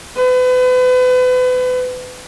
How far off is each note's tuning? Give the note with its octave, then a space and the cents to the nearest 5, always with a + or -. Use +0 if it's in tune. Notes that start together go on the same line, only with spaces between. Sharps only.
B4 +35